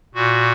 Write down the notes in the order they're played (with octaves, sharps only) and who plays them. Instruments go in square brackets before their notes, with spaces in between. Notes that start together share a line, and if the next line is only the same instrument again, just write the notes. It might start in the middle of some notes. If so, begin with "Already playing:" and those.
[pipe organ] A#2 F#4